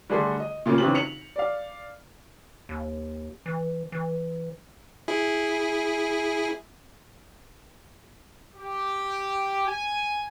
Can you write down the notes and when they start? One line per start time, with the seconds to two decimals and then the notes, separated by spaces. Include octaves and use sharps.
0.10 D3 G3 A3 G#4 A4 C6
0.40 D#5
0.66 A#2 C#3 A3 A#3 F4
0.78 B1 C#3 E3 C4 G4 F#7
0.95 C#7 F7 F#7
1.36 D5 F5
2.69 D#2
3.46 E3
3.92 E3
5.08 E4 G#4
8.55 G4
9.66 G#5